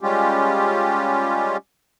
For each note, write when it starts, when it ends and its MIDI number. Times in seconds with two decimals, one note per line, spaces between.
0.01 1.57 55
0.01 1.57 56
0.01 1.57 61
0.01 1.57 65
0.01 1.57 67